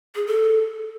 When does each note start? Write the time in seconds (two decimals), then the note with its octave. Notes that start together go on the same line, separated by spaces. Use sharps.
0.15 G#4
0.27 A4